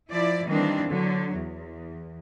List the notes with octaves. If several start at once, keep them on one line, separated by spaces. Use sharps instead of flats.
F3 E4 D5
D#3 E3 G3 A#3 C4 D4
D3 F#3
E2